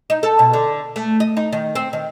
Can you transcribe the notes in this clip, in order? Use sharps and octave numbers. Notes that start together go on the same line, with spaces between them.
D#4
A4
B2
D3
A3
D#5
D#4
D#3
C4
D#3